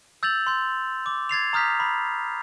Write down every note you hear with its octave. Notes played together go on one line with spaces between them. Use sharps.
E6 G6 A6 F7 F#7
C6 G6
D6
G#6 A6 C7 F7
A#5 D#6 F6 G6 B6
B5